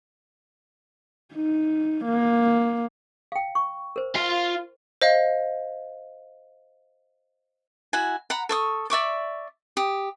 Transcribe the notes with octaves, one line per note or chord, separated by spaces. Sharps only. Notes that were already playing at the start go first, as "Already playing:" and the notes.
D#4
A#3
F5 G5
C#6
A#4 C5
F4 F5
C5 D#5 F5
E4 F#4 F#5 G#5
F#5 A#5 B5
A4 C#6 D#6
D5 E5 C#6 D6
G4 D#6